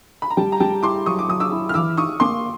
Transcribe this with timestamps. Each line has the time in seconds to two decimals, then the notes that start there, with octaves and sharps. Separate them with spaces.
0.22 B5
0.30 A#5
0.37 G3 G5 A5
0.52 A#5
0.60 G3 G5 A5
0.83 E4 C6 D6
1.06 F#3 C#6 D#6
1.19 D6
1.28 F#3 D#6
1.40 D6 E6
1.52 E4
1.69 F6
1.74 E3 D6 E6
1.97 D#4 C#6 D#6
2.20 A#3 C6 D6